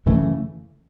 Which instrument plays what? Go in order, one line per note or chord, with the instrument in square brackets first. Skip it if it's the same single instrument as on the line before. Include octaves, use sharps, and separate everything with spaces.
[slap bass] F#2 C#3 E3 A3